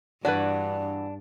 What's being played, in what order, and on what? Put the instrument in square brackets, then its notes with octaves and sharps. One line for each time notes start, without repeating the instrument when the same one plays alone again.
[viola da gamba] G2 [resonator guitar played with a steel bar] E3 F#4 [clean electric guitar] D4 [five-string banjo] B4 D5